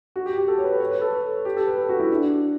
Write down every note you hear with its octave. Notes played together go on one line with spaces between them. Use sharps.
F#4
G4
G4
A4
C#5
B4
C#5
B4
A4
G4
A4
B4
A4
F#4
E4
D4